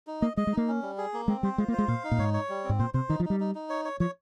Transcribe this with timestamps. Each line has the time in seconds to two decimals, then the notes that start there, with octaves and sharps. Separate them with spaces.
0.07 D#4
0.22 A#3 D#5
0.37 G#3 D#5
0.47 G#3
0.52 A#3 D#4
0.68 C#4
0.82 G3
0.98 G#4
1.13 A#3
1.28 G#3 C4
1.43 G3 C5
1.58 G#3 F4
1.68 A#3
1.73 C5
1.78 G#3
1.88 A#2 F5
2.04 D#4
2.12 A#2
2.19 G#2 C#5
2.34 C#5
2.49 G3
2.64 C4
2.69 G#2
2.79 A#2 C5
2.94 C3 C5
3.09 D#3 D#4
3.20 F3
3.25 G3 D#4
3.40 D#4
3.55 D#4
3.70 C#5
3.85 C#5
4.00 F3 C#5